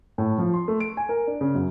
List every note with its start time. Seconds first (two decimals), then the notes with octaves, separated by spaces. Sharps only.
0.18 A2
0.38 F3
0.53 C6
0.68 A3
0.80 D7
0.97 G#5
1.09 A#4
1.27 D4
1.41 C#3
1.55 F#2